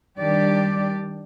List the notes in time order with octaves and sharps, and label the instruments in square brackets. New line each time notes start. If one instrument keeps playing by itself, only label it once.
[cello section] D#3 G3 D4 G4 D5